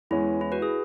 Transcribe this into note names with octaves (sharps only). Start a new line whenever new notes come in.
E2 E3 G#3 C#4 E4
E4
F#4 B4
G#4